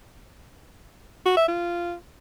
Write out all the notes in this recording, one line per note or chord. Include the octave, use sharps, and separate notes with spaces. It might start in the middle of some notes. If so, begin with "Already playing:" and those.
F#4
E5
F4